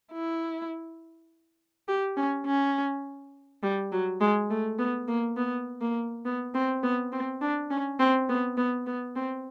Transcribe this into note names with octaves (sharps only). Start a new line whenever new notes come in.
E4
G4
C#4
C#4
G3
F#3
G#3
A3
B3
A#3
B3
A#3
B3
C4
B3
C4
D4
C#4
C4
B3
B3
B3
C4